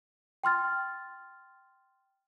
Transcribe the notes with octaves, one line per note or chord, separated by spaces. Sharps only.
G5 C6 F6 A6